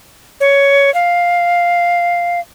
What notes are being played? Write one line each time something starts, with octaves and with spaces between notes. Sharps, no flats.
C#5
F5